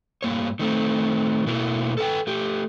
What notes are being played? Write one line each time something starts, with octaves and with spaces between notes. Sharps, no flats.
G2 A#3 C#5
D#3 A3 C4
B2 A#3 B3 E4
A4 B4 F#5 G5
A3 G4